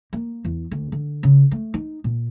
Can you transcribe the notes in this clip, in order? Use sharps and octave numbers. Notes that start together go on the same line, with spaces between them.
A#3
E2
D2
D3
C#3
A3
D#4
A#2